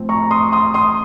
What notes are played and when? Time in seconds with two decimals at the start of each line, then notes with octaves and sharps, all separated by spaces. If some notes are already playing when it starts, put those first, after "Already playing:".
Already playing: A2 F3 C4
0.09 A#5 C#6
0.31 C6 D#6
0.52 C6 D#6
0.74 C6 D#6